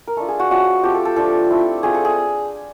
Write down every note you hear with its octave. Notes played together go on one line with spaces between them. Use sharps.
A#4
A3 D4 F4 A4
G#4
F#4
F3 G#3 C#4 F4 F#4
F3 A3 C4 G4
A4
A4
F3 A3 D4 F4 A4
A3 C4 E4
A3 C4 F4 G#4
A4
G#4